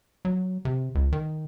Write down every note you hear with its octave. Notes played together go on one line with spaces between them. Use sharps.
F#3
C3
C#2
D#3